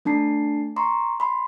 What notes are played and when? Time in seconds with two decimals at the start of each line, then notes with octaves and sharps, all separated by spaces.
0.05 A3 D4 A5 C7
0.76 A#5 C6 C#6
1.20 B5 C6